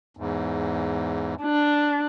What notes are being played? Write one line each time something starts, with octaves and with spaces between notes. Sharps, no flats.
E2 G#2
D4